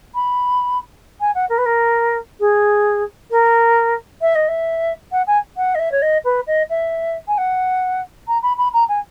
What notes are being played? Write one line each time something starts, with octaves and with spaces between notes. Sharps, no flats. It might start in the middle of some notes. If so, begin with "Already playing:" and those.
B5
G#5
F#5
A#4
B4
A#4
G#4
A#4
E5
D#5
E5
F#5
G#5
F#5
D#5
E5
C#5
D#5
B4
D#5
E5
G#5
F#5
A#5
B5
B5
A#5
G#5